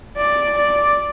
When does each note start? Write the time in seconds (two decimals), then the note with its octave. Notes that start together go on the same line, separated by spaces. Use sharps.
0.17 D5